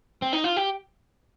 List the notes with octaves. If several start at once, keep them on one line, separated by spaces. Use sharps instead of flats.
C4
D#4
F4
G4